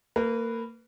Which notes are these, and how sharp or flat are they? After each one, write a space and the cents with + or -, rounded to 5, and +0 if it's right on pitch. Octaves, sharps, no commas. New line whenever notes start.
A#3 -30 B4 +0